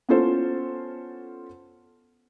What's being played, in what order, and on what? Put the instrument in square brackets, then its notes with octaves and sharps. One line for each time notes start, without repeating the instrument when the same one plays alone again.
[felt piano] B3 C#4 E4 F4 A4 C5